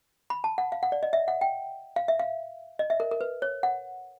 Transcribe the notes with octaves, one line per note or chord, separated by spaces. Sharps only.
B5
A5
F#5
F5
F#5
D5
D#5
E5
F#5
G5
F5
E5
F5
D#5
E5
A#4
A#4
B4
C#5
F#5